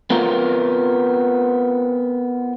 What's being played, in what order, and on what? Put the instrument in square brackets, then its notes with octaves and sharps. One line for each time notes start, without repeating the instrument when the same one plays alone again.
[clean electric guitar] B3 C4 F4 A#4